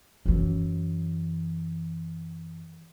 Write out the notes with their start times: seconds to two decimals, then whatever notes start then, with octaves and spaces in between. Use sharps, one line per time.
0.26 F#2 E3